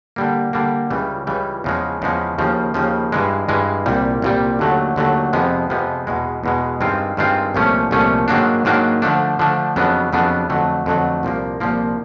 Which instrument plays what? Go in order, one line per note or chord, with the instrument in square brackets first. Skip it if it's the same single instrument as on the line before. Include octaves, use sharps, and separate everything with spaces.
[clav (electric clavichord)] D3 G3 A#3
D3 G3 A#3
C#2 C#3 E3 G3
C#2 C#3 E3 G3
E2 C#3 F3 G#3
E2 C#3 F3 G#3
D#2 C#3 F3
D#2 C#3 F3
G2 E3 G#3
G2 E3 G#3
C2 A#2 G3
C2 A#2 G3
D#2 D3 F#3 A3
D#2 D3 F#3 A3
F2 C3 F3 G#3 B3
F2 C3 F3 G#3 B3
E2 B2 G#3
E2 B2 G#3
G2 D#3 G#3 C4 F4
G2 D#3 G#3 C4 F4
C2 A#2 F3 A3 C#4
C2 A#2 F3 A3 C#4
G#2 D#3 F#3 A#3 D4
G#2 D#3 F#3 A#3 D4
D3 F3 A3 D4
D3 F3 A3 D4
F2 C#3 F#3 B3 D4
F2 C#3 F#3 B3 D4
F2 D3 F#3 A3
F2 D3 F#3 A3
C2 A#2 F3 A#3
C2 A#2 F3 A#3